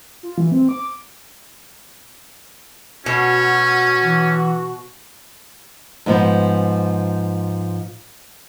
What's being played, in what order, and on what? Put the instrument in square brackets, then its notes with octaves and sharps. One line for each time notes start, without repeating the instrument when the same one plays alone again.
[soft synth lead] F4
E3
C4
D6
[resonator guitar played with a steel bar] B2 [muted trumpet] C#4 [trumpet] F#4
[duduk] E3
[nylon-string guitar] G#2 F3 B3